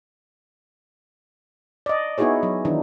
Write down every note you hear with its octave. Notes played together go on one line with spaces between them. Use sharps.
D5 D#5
B3 D#4 E4 F#4 G#4 C#5
F#3
D#3 E3 D4 D#4